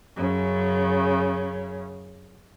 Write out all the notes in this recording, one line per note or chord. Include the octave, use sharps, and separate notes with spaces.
F#2 C#3